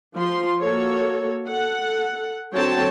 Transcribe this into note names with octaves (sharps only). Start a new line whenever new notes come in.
F3 F4 C6
A#3 F#4 A4 C#5
A4 F#5
D3 F#3 C4 C#5 G5 A5